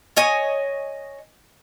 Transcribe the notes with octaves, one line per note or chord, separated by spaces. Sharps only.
C#5 D#5 G#5